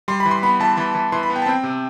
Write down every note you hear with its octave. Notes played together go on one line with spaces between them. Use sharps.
G3 C6
B5
E3
C6
B3 B5
E3 A5
E3 B5
E3
E3 C6
B5
B3
G5
A5
C4 G5
C3